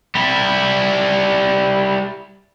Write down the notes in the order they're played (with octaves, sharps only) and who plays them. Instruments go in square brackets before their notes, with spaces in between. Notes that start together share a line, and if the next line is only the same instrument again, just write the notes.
[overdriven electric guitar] G3 E4